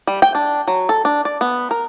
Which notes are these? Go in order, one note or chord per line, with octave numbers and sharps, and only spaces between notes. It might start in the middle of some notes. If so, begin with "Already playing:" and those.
G3
G5
D4
F#3
A4
D4
D5
B3
A#4